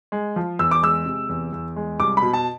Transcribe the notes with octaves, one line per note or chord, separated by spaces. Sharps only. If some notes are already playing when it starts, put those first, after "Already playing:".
G#3
F3
E2 E6
D6
G#3 E6
C3
E2
E2
G#3
C2 D6
B5
B2
A5